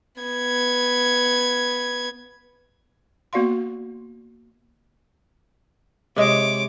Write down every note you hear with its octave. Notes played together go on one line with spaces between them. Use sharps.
B3 G#6
A#3 B3 F#4 D5 F5 C6
C3 G#3 C#5 D6